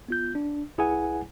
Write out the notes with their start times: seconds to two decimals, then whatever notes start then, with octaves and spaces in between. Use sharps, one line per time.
0.08 B3 F4 G6
0.35 D4
0.78 C2 E4 G#4 B4 F#5 G#5